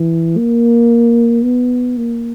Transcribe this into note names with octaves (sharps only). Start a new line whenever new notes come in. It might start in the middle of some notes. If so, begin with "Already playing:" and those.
Already playing: E3
A#3
B3
A#3